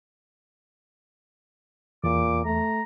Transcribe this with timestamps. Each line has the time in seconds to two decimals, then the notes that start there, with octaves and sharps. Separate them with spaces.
2.04 E2 A#2 D6
2.45 A3 A#5